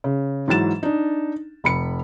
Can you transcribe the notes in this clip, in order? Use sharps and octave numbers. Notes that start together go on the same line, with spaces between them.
C#3
G#2 E3 F#3 A6 E7
D4 D#4
F1 B5 C#7